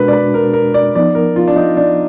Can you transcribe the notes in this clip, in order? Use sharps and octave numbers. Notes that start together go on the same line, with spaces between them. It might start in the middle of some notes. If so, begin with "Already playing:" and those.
Already playing: B2 G#3 D4 F#4 A#4 B4
D5
B4
A#4
A#4
D5
F3 B3 D#4 D5
A#4
F4
D4
D#4
D4